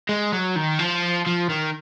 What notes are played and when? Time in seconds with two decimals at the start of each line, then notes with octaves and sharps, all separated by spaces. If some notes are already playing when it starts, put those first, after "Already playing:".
0.09 G#3
0.32 F#3
0.56 D#3
0.79 F3
1.27 F3
1.49 D#3